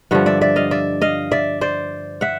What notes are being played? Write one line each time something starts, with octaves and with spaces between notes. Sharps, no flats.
G2 D3 F3 E5 F#5
D5 E5
D5 E5
D#5 F5
D5 E5
D#5 F5
D5 E5
C5 D5
E5 F#5